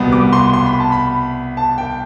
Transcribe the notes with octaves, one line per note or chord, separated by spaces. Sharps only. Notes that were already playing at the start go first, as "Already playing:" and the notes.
Already playing: C2 B2 B3
D6
C6
C6
B5
A5
B5
A5
G5